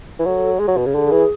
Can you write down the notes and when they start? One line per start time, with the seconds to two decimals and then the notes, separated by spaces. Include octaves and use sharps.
0.19 E3
0.26 F#3 A4
0.59 G#3
0.68 F#3
0.77 B2
0.86 C#3
0.94 D3 G#4
1.11 E3